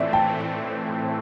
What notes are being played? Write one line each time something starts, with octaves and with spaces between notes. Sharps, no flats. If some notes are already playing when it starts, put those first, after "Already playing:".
Already playing: A2 E3 A3 C4 D5 E5
G5 A5